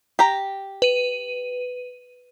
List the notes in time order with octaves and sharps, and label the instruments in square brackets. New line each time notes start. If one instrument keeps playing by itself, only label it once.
[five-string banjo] G4 A#5
[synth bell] B4 D#7